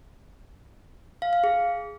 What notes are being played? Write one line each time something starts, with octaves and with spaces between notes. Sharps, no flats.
F5
F5
G#4